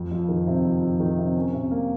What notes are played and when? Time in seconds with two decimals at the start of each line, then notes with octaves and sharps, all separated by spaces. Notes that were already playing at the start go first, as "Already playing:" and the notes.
Already playing: F2
0.11 F2
0.29 D#3
0.47 C3
0.65 F2
0.82 F2
1.00 D#3
1.18 C3
1.36 C#4
1.54 C3
1.71 A#3